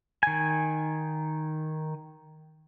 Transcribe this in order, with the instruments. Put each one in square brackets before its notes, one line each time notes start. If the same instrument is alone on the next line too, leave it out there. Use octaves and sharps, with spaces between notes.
[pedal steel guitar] D#3 G#5